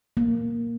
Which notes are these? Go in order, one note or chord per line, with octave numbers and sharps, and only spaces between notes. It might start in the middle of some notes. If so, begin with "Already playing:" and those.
A#3